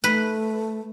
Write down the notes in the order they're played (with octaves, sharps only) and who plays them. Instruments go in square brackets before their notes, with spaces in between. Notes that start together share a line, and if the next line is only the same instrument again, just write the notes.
[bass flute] A3 [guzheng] B4